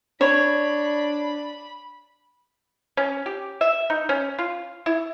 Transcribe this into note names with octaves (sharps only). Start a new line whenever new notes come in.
D4 C#5 B5
C#4
G4
E5
D#4
C#4
F4
E4